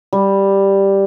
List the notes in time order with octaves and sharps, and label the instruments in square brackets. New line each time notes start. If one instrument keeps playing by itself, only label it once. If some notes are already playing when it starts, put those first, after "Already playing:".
[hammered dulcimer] G3